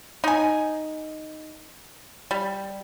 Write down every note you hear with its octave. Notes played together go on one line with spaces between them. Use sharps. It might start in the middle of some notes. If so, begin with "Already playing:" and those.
D#4 G#5
G3